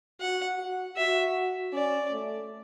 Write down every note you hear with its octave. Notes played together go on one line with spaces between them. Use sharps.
F#4 F#5
F#4
F#4 E5
C#4 D5
A3